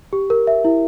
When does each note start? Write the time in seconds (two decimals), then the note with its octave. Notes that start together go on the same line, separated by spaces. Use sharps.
0.13 G4
0.30 A#4
0.47 E5
0.65 E4